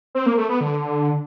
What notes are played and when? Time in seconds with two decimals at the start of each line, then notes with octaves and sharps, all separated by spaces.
0.15 C4
0.26 A#3
0.38 A3
0.49 B3
0.61 D3